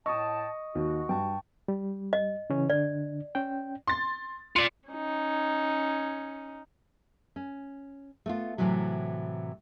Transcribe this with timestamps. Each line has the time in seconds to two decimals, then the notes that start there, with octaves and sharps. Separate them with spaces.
0.06 A2 D#5 G5 A5 C#6 D#6
0.75 D#2 F#4
1.09 G2 G5 A5 C#6
1.68 G3
2.13 D#5
2.50 C#3 E3 C#4
2.70 D3 D4 D5
3.35 C#4 G5
3.87 C6 A6
4.56 F4 D5 C#7
4.89 C#4 D#4
7.36 C#4
8.26 A3 B3 F4
8.58 A2 C3 D#3 E3 F#3